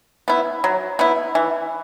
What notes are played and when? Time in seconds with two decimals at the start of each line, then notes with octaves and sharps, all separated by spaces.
0.28 B3 E4
0.64 F#3
0.99 B3 E4
1.35 E3